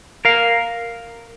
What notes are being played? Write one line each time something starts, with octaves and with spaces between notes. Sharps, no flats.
A#4 F5